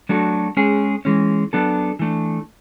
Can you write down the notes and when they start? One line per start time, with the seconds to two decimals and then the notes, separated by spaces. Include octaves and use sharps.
0.09 F#3 A3 D4 F#4 A4
0.57 G#3 C#4 G#4
1.05 E3 G#3 C#4
1.53 F#3 B3 D4 A4
1.99 E3 A3 D4